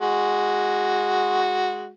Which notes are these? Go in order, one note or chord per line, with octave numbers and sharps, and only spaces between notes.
G#3 F#4